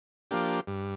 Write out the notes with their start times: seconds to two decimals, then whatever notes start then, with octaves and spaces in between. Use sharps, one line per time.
0.31 F3 A#3 D4 G4
0.67 G2